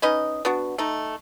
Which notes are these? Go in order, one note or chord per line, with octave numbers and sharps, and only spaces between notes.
C#4 D#4 B4 D#5
B3 D4 F#4
A3 D#4